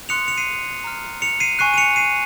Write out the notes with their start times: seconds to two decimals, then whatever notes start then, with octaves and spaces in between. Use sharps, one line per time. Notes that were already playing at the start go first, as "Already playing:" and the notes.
0.09 C6 D#6 F#6 C#7 F7
0.28 C#7 F7
0.37 C7 D#7
0.84 A#5 F6
1.22 C#7 F7
1.40 C7 D#7
1.59 G#5 C#6 F#6 C7 D#7
1.74 D#7
1.78 C#7 F7
1.96 C7 D#7